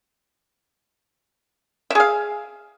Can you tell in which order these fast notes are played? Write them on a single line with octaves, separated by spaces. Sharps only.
E5 G#4 F5